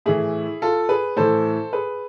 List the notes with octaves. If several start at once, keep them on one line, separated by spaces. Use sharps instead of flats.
A2 E3 E4 G#4
F4 A4
G#4 B4
A2 E3 A4 C5
G#4 B4